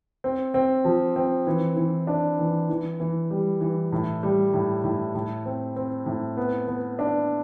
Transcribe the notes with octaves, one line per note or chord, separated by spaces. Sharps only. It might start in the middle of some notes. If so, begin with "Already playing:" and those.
C4
C4
F3
C4
E3
E3
D4
E3
E3
E3
G3
E3
A2
G3
A2
A2
A2
C4
C4
A2
B3
B3
D4